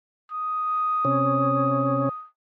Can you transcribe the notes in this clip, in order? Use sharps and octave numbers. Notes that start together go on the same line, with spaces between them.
D#6
C3 C#4